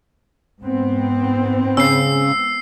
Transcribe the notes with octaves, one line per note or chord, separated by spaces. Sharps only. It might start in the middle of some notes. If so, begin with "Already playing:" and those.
G#2 B3 C4
C#3 E6 C7